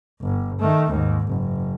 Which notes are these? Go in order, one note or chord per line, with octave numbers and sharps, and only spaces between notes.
G1
D#3 A3
D#2 G#2
F#1